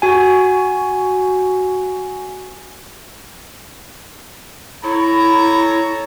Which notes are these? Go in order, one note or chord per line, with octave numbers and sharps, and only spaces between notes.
F#4 G#5
E4 A4 C#5 A#5 B5